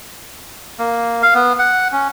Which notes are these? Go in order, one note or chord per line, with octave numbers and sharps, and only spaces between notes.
A#3
F5
B3
F#5
C#4